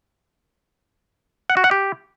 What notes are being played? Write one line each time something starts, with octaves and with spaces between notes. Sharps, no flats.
F#5
F#4
F#5
G4